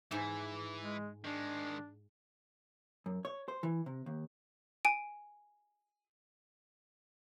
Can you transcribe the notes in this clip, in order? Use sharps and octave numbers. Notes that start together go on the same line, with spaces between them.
G#2 E3 E4 E5
G#3
D#3 G#3 D4
F#2
C#5
C5
E3
C3
D#2
G#5 D7